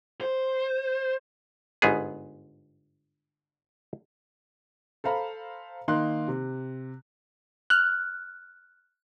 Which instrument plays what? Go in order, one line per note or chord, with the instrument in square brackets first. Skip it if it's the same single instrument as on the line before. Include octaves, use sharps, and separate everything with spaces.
[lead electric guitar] C5
[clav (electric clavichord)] G1 G#2 B3 G#4
[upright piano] A4 C5 F5 A#5 B5
D#3 A#3 D#4 C6 F#6
C3
[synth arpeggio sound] F6 F#6